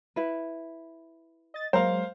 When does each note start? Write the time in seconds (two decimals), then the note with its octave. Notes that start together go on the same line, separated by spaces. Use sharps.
0.16 E4 B4
1.54 D#5 A6
1.73 F#3 G#3 A#3 A#4 C5 F5